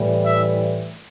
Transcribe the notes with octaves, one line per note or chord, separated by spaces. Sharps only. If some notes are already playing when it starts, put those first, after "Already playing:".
Already playing: A2 E3 G3
E5